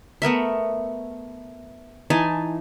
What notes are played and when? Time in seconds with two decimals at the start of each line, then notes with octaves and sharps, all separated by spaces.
0.22 A3 B3 A#4 E5
2.10 E3 D#4 G#5 A5